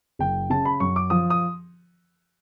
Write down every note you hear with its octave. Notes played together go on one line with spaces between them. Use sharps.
F#1 G5
C#3 A5
B5
F#2 C#6
D6
F3 D#6
D#6